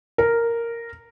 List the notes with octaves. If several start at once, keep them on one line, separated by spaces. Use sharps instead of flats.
A#4